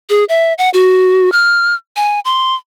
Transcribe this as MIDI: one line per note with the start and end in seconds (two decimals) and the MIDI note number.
0.10 0.24 68
0.29 0.53 76
0.58 0.70 78
0.74 1.32 66
1.32 1.74 89
1.97 2.20 80
2.25 2.55 84